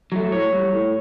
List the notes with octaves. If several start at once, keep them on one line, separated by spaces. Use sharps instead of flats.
F#3 A3
A2 C#5
G3
A2